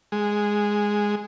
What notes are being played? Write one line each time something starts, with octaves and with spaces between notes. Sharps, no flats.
G#3